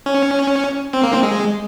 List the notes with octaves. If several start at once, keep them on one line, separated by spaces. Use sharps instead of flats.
C#4
C4
A#3
C4
G#3